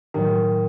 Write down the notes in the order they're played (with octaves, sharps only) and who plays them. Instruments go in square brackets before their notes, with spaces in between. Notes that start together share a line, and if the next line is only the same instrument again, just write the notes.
[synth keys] A2 F#3 [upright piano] D#3